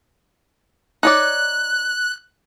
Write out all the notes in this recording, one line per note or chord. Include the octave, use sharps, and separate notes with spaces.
D#4 C#5 D5 F#6